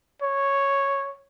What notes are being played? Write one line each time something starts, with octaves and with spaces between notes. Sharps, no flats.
C#5